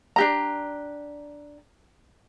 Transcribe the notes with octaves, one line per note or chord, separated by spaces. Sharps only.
D4 G4 A#5